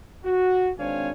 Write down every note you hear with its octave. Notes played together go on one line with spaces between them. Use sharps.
F#4
G#1 C4 D4 C#5 F5 G#5